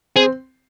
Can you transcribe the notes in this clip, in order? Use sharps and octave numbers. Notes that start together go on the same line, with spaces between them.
C4 G#4